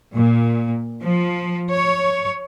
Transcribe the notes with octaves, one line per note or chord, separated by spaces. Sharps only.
A#2
F3
C#5